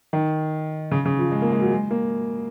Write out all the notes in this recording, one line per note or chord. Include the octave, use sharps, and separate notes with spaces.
D#3
C#3
C#3
F3
G#3
A#3
G#3
F#3
G#3
A#3